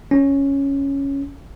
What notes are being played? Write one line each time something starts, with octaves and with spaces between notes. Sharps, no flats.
C#4